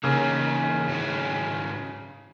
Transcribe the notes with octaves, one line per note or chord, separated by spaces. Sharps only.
C#3 E3 A#3 D#4 A#4
G#2 D#3 F#3 C#4 E4